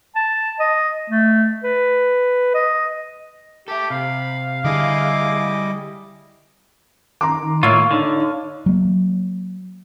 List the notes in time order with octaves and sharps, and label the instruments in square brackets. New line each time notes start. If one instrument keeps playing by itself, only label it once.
[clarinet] A5
D#5
A3
B4
D#5
[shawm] G4 [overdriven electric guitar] A4 E5
[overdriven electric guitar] C3 [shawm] F5 [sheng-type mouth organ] B5
[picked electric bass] D3 [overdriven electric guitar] G3 G#4 [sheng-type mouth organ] E4 D#5 D6
[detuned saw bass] D#3 [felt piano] A#5 C6 D6
[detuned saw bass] A2 [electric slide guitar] A#3 E4 F4 [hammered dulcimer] C#5 F5
[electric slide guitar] D3 [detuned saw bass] D#4
[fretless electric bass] F#3 A#3